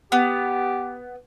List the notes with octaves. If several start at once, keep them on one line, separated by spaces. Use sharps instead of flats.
B3 G4